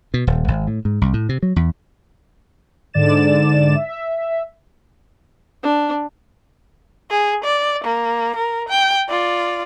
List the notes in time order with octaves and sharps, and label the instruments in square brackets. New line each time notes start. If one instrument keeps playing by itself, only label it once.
[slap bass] B2
D#1
G#1
A2
G#2
C2
A2
C3
F#3
E2
[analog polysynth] G#2 D3 D5 A6 E7
E5
[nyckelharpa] D4
[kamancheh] G#4
D5
A#3
A#4
G5
F4 D5